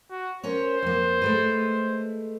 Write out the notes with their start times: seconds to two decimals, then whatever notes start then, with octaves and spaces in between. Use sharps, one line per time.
0.11 F#4
0.43 C#4 A#4 C5 C#5
0.82 F2 A#3
1.22 G#3 A3 B4